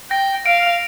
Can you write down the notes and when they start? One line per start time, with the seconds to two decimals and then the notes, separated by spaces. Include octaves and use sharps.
0.11 G5 A#6
0.46 F5 D7
0.63 F7